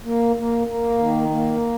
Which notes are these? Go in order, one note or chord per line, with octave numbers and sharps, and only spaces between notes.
A#3
A#3
A#3
D#3
A#3